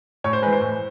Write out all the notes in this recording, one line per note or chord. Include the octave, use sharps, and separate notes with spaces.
A2 C#5
C5
E3 G#3 B4
C5
A2